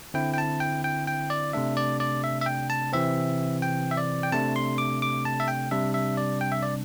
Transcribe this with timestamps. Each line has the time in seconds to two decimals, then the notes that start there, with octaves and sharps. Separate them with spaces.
0.14 D3 C4 E4 G5
0.34 G5
0.38 A5
0.60 G5
0.84 G5
1.07 G5
1.30 D5
1.53 C3 A3 D4 E5
1.77 D5
2.00 D5
2.24 E5
2.41 E5
2.46 G5
2.70 A5
2.93 C3 E3 C4 E5
3.62 G5
3.91 E5
3.97 D5
4.23 G5
4.32 C3 A3 D4 A5
4.56 C6
4.78 D6
5.02 D6
5.25 A5
5.40 E5
5.48 G5
5.71 C3 G3 D4 E5
5.94 E5
6.17 D5
6.41 G5
6.52 E5
6.63 D5